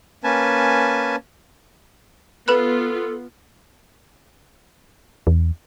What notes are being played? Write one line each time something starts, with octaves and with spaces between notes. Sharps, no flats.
A#3 C#4 B4 G#5 A5
B3 F4 A4 B4 B5 F#6
E2